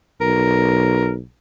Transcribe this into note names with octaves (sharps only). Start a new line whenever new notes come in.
B1 A#4